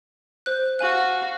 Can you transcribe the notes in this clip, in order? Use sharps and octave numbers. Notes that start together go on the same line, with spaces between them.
C5 F#6
F#4 F5 G#5 F#6